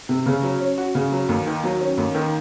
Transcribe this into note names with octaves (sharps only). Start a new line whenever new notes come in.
C3
C#3
F#3
C#4
F#4
C#3
F#3
D#2
D#3
F#3
C#4
D#2
D#3